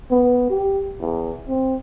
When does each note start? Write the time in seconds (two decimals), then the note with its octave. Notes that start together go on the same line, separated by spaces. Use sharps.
0.11 B3
0.50 G4
1.00 E2
1.48 C4